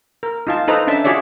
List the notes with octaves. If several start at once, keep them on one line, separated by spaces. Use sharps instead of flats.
A#4
D#4 F4 A5
D#4 A4 B4 C5 D#5 A#5
C#4 D4 E5 A5
F4 F#4 G#4 C#5 D5 E5